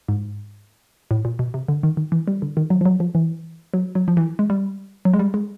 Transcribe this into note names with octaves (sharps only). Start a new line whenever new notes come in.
G#2
A2
A#2
B2
C3
D3
D#3
D#3
E3
G3
D3
D#3
F#3
F3
F#3
F3
E3
F#3
F#3
F3
E3
G#3
G3
F#3
G#3
G3
G#3